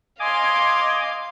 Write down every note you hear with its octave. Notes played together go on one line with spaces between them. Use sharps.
D#5 F5 G#5 C6 D6